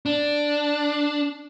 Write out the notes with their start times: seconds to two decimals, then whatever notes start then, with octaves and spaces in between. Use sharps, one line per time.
0.06 D4